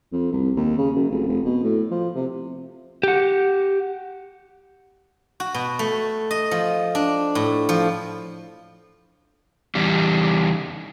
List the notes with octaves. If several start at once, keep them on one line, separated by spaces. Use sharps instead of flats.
F2
C2
D#2
C#3
F#2
F1
F1
B2
A2
F3
C3
G4 F#5
F#4
B2
A3
D#5
F3
D4
A2
F3
E2 G3